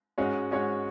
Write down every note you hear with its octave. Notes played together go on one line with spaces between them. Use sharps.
G#2 G#3 C#4 F#4 C#5
G#2 G#3 C#4 F#4 C#5